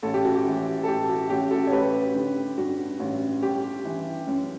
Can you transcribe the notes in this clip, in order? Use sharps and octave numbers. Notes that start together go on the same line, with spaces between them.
A1 A4
G4
F#4
G4
E3
A4
A2 G4
F#4
A1 G4
F#4 A4
C#5
A1 G4 B4
D3
G2 F#4
A1
G1 G4
E3
F#2